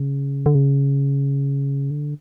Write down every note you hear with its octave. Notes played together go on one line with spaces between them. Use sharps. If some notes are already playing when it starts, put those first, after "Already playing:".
Already playing: C#3
D3
C#3
D3